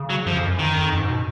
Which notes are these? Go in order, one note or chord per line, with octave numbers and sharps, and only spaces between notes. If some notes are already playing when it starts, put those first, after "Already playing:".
Already playing: C#3
F#3
F#2 F3
F2
F#2
D#3
F2
F#2
G#2
B2